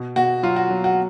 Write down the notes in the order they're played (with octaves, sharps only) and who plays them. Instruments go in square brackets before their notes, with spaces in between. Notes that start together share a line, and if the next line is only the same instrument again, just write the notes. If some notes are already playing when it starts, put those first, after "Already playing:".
Already playing: [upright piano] B2
B2 F#4
F#3 F4
F#4
F#3
F#4